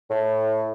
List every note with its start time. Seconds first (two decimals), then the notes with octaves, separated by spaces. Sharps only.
0.10 A2